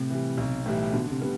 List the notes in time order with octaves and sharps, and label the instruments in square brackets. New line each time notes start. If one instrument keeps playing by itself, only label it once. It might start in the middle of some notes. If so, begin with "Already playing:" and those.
Already playing: [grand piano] A2 [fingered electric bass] C3
[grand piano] E3 G3
B1
A2 E3 G3
[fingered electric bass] B2 [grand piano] D3
[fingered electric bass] C3
[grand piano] G3 B3